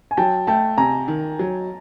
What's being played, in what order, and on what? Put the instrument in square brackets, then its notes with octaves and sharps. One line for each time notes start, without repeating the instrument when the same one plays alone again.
[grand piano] G#5
[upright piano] F#3 [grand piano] G5 A5
[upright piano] A3 [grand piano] G5 A5
[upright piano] C3 [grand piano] G#5 A#5
[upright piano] D#3
F#3